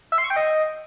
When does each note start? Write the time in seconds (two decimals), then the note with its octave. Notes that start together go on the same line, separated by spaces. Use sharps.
0.12 E5
0.18 C6
0.24 C#6
0.30 G5
0.36 D#5